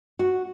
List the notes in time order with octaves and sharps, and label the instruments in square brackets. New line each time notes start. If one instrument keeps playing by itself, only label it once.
[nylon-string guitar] F#4